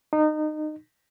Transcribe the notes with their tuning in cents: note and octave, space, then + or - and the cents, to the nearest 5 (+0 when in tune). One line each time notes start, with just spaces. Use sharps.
D#4 -25